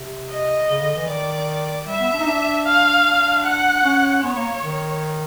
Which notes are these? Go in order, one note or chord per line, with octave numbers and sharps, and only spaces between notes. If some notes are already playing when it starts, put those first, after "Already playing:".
Already playing: C3
D#5
C#3
D3
E3
D#3 D5
G3 E5
B3
D4
D#4
D4
F5
D4
F#5
C#4
B3 C#5
A#3
D#3